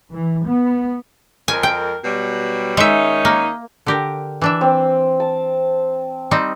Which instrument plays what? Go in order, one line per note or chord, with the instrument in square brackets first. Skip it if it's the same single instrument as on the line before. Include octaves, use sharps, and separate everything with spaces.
[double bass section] E3
B3
[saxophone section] F2 A#4 [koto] G#5
[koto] G5
[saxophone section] B2 F#3 G3
[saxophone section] D#3 C#4 D#4 [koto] G#3 E5
[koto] A#3
D3 G4 A#4
E3 D4 E5
[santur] C4
A5
[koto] G3 C4 D#4